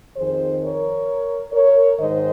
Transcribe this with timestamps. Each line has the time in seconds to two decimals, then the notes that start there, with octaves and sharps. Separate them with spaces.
0.16 F2 D#3 G#4 C5
0.62 A#4 C#5
1.53 A#4 C#5
1.99 G#2 D#3 C5 D#5